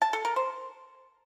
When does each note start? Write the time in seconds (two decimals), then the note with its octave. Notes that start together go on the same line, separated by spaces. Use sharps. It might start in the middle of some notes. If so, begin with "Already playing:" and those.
0.02 A5
0.13 A4
0.25 A#4
0.36 C5